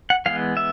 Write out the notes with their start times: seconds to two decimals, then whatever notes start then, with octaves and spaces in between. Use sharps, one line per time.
0.10 F#5
0.26 E3 G#3 B3 F5
0.57 E5